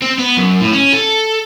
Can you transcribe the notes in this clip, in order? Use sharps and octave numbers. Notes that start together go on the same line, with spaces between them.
C4
B3
F#2
A2
C#4
A4